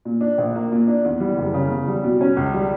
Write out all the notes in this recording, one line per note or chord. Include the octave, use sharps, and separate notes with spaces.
A#2
D4
A#1
A#3
A#2
D4
E2
G3
F#1
C#3
E2
G3
B2
C#4
C#2
G3